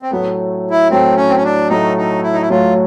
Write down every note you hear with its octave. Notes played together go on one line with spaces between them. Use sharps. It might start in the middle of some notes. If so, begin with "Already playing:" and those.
C4
A2 F#3 A3 B3
E4
A2 F#3 A3 C4
C#4
C4
C#4
D4
A2 F#3 A3 D#4
D#4
E4
D#4
E4
A2 F#3 A3 F4